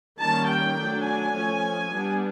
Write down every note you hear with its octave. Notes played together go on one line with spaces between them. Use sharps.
D#3 G3 A#3 C#4 A5
G5
F#3 A3 D4
G#5
F3 A3 C#4
G3 B3 D4